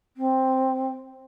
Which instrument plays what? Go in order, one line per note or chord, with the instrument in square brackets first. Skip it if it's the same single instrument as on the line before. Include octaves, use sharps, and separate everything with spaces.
[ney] C4